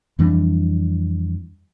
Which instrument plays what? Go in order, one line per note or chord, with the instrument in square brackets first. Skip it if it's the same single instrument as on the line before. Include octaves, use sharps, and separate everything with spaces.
[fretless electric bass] F2 E3 G3 D4